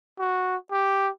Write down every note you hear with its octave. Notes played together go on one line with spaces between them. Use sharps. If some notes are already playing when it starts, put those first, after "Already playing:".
F#4
G4